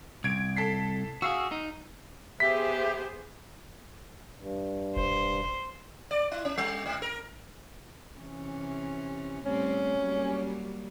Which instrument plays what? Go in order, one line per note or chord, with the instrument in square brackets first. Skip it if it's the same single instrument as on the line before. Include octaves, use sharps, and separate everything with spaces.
[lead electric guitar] C2 [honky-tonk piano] G#6 D7
[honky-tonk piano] A4 B6 C7
[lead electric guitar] F#4 G#4 [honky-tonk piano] F5 E6
[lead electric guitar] D#4
[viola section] B3 G#4 C5 [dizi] G4 [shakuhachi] E5 [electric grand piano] B6
[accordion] G2
[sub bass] E1 [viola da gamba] C5
[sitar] D5
E4
C#4
G3
G#2
A#4
[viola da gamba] C3 E3 C#4
[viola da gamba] A2 G3 C4 [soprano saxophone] C#4
[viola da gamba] F#3 G3 A#3